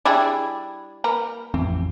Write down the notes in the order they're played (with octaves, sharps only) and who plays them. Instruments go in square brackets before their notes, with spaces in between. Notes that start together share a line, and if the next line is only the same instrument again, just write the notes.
[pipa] G3 D4 E4 [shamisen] G#4 D5
[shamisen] A#3 A#4 B4
[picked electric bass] A1 F2 C4 [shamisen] E3